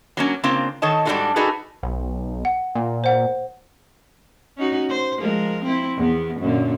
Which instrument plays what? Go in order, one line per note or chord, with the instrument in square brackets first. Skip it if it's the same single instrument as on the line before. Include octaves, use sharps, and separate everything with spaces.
[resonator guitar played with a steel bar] F#3 A#3 C#4
C#3 A#3 C4 D4 F4
D#3 A4 C#5 D#5 A5
G#2 G3 D4 F4 F#4 A4
D4 D#4 F#4 G#4 A4 B4
[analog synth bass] B1
[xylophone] F#5
[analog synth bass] A#2
[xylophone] C5 F#5
[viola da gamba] C#4 D#4 F#4
C5
F3 G#3 A#4
C4 E4
E2 B3
F#2 A#2 D3